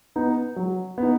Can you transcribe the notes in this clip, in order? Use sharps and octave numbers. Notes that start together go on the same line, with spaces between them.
B3 D#4
F#3
B3 D#4